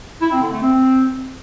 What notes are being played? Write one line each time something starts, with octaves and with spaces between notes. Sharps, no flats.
E4
C4
D3
A3
C4